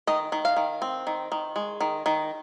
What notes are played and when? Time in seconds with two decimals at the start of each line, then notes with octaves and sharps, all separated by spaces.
0.07 D#3 D#5
0.32 D#3
0.45 F5
0.57 D#3
0.82 C4
1.07 D#3
1.32 D#3
1.56 G#3
1.81 D#3
2.06 D#3